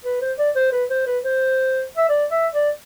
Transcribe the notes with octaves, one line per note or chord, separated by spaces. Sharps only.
B4
C5
D5
C5
B4
C5
B4
C5
E5
D5
E5
D5